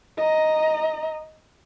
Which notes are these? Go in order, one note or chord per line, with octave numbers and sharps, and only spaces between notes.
D#5 A#5